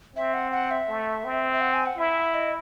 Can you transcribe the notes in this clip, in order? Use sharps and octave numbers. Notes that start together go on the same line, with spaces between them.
C4 E5
F#5
F#5
E5
A3
C4
E5
F#5
G#5
F#5
E4 E5
D#5